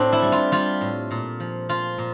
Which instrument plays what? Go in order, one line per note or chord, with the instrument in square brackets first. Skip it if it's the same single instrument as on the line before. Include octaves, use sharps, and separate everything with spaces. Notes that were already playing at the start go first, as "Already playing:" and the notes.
Already playing: [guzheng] A2 C4 D4
E4
G3
F4
G3 F4
A2
A#2
F3
F3 F4
A#2